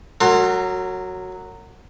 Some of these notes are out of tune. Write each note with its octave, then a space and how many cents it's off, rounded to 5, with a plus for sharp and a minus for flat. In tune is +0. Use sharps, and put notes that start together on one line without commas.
F#3 +0 A#4 -40 C6 +15